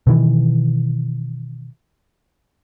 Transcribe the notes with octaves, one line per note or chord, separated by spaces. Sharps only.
B2 D#3 E3